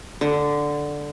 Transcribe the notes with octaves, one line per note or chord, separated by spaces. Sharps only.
D3